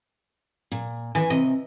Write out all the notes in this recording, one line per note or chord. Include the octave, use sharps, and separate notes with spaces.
A#2
E3 G#5
C3 D#5